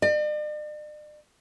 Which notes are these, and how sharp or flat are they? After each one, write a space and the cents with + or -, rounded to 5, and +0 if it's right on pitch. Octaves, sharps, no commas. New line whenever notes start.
D5 +45